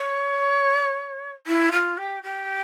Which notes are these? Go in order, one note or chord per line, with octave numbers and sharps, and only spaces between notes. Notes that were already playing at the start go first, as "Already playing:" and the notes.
Already playing: C#5
E4
F4
G4
G4